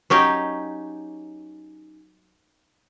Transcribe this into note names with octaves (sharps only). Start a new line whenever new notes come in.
F#3 C#4 D#4 G4